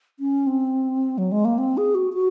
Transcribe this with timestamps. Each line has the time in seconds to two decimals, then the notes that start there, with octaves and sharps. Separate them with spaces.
0.20 C#4
0.47 C4
1.18 F#3
1.32 G#3
1.45 A#3
1.58 C4
1.77 G#4
1.95 F#4
2.13 F#4